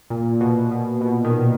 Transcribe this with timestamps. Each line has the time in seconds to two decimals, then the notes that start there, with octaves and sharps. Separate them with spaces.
0.10 A#2
0.41 B2
0.71 B2
1.01 B2
1.24 D#3